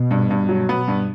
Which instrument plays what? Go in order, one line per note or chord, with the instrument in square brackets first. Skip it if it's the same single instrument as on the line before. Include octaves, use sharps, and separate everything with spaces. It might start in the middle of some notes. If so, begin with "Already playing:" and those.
Already playing: [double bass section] B2
[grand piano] G2
G2
F#3
B3
G2